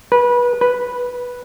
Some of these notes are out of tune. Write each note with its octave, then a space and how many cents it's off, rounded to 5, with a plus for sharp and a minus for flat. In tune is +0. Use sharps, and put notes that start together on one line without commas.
B4 -25
B4 -5